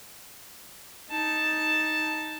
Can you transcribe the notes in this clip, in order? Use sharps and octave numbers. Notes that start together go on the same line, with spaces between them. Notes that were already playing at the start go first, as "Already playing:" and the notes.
D#4 A5